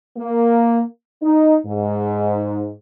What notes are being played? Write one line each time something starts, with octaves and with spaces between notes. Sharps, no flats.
A#3
D#4
G#2